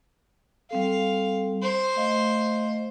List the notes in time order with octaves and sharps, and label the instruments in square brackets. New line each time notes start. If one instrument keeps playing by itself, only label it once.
[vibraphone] G3 C4 A4 [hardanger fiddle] F5
[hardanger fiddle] C5
[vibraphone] A3 D#5 F5